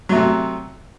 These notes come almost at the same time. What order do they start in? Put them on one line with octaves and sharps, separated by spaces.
F#3 A3 C3